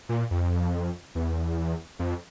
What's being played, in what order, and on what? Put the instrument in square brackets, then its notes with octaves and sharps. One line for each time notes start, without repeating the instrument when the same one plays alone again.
[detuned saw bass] A#2
F2
E2
F2